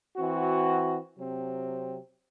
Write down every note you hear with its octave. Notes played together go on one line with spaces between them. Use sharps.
E3 C4 F#4
C3 F#3 C4